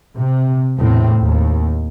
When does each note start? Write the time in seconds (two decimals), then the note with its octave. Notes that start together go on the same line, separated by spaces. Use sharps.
0.17 C3
0.78 E2 A2 C4
1.18 D#2